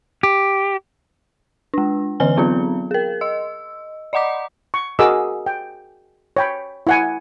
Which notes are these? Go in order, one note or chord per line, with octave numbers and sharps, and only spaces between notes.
G4
G#3 D4
D3 E3 B4 G#5 G7
F#3 B3 C4 F4
G#4 A#4
D#5 E6
D5 D#5 F#5 A#5 D6
C#6
F#4 G#4 A#4 D#5 D6 E6
G5
C#5 G5 B5
E4 F#5 G#5